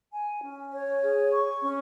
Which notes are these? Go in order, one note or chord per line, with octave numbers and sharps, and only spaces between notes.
G#5
C#4
C#5
G#4
C#6
C#4